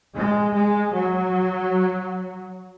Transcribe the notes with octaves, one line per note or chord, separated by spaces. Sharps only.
G#3
G#3
F#3